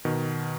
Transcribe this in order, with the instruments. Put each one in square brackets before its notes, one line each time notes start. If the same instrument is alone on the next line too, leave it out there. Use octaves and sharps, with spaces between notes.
[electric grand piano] B2 D#3